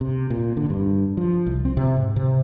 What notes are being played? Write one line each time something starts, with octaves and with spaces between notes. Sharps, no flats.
C3
A#2
D3
G2
F3
C2
C4
C3
G#2
C3